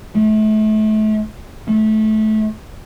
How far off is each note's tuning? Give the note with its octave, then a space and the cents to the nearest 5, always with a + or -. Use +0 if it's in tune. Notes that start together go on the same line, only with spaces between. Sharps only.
A3 -35
A3 -20